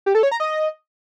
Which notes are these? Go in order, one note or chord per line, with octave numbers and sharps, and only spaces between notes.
G4
A4
C#5
A#5
D#5